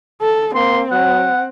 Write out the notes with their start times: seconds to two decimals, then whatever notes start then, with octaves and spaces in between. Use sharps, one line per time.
0.22 A4
0.56 A#3 C4 C6
0.91 F#3 F#5